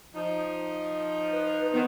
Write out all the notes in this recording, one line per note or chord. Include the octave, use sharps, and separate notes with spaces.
F3 D#4
B4
D#3 B3